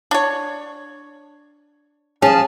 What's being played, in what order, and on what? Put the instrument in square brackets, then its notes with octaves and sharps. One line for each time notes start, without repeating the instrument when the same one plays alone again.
[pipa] D4 C#5
[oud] F3 C#4 [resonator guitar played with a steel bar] G#4 [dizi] A5